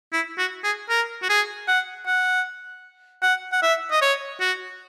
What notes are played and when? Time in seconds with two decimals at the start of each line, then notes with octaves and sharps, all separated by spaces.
0.13 E4
0.38 F#4
0.64 G#4
0.89 A#4
1.22 F#4
1.29 G#4
1.68 F#5
2.07 F#5
3.23 F#5
3.52 F#5
3.62 E5
3.91 D#5
4.01 C#5
4.40 F#4